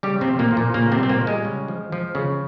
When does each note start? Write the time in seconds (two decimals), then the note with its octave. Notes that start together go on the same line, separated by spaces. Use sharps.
0.03 C#3 G3 G4
0.21 C3 C4
0.27 F3
0.39 A#2 A#3
0.51 F3
0.57 A#2 A#3
0.74 A#2 C#3 A#3
0.92 C3 C4
0.98 G3
1.03 C4
1.09 A#2 A#3
1.21 G3
1.27 G#3
1.45 C#3
1.68 F3
1.92 F3
2.15 C#3